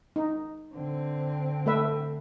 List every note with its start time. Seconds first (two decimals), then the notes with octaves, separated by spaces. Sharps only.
0.16 D#4
0.74 D3 C4
1.66 A3 B4 E5